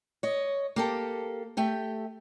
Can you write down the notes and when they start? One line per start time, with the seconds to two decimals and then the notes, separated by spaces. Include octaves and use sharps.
0.23 C#5 D#5
0.76 A#3 G4 A4
1.57 A3 G4 G5